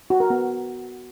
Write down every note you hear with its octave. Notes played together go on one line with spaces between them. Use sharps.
F#4
A#4
B3